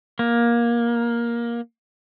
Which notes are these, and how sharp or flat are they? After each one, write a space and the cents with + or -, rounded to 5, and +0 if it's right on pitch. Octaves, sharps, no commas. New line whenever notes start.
A#3 +15